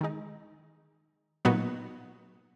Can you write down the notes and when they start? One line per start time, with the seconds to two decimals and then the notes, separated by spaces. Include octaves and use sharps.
0.01 D#3 G#3 D#4
1.45 A#2 F#3 B3 D#4 F#4